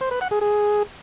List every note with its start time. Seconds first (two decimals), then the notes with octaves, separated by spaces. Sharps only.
0.01 C5
0.11 B4
0.21 F#5
0.31 G#4
0.41 G#4